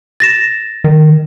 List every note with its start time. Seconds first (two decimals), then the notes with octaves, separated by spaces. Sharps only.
0.20 A6 A#6 E7
0.84 D#3